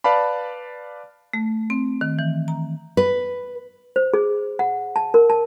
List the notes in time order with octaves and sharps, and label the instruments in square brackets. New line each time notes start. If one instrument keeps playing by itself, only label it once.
[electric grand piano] B4 D5 F5 A5 B5
[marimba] A3
C4
D#3
E3
A#5
[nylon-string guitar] B4
[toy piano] C5
G#4
F#5
A5
A#4
A5